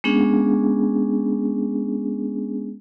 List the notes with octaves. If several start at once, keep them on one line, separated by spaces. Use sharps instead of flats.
G#3 B3 C#4 D4 G#4